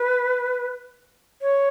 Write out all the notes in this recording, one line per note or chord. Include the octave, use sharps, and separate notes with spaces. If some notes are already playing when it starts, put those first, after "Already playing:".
Already playing: B4
C#5